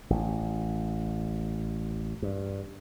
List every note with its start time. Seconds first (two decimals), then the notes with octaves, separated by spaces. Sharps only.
0.10 A1
2.22 G2